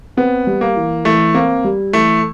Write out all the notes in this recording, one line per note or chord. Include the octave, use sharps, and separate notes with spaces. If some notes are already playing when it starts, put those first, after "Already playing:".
B3 C4
G3
A#3
E3
E3 A3
A#3 C4
G3
E3 A3